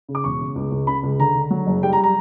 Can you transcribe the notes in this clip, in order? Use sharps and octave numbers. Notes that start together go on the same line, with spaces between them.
C#3
D6
E1 C#6
C#3
C#2
C#2
C#3 B5
C#2
D3 A#5
D3
F#3
F#1
G3 G5
A#5
A#5